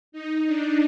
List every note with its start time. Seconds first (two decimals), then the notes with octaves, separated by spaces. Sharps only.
0.12 D#4
0.47 D4